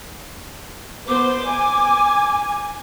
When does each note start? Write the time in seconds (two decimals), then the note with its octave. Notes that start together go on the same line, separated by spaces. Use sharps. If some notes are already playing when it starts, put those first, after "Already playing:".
1.08 B3 C5 D6
1.49 G#5